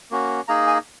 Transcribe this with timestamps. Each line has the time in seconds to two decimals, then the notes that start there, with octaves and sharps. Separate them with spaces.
0.11 A#3 C#4 F#4
0.48 A#3 D#4 G#4 A#5
0.67 G#5